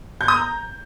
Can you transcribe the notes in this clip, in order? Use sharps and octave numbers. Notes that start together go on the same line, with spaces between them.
G6
D#6
A#5